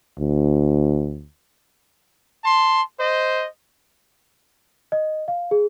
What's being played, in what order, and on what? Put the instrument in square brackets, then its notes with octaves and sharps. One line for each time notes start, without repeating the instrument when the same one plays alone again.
[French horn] D2
[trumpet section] A5 C6
C5 D#5
[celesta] D#5
F5
G#4